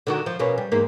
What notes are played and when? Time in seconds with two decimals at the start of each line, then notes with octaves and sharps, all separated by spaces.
0.07 D3 D#3 F#4
0.26 F3
0.39 B2 A#3 C#4
0.58 G3
0.71 E2 G#2 A#3